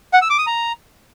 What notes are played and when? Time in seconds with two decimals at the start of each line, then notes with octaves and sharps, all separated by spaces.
0.13 F#5
0.22 E6
0.30 D6
0.38 D#6
0.47 A#5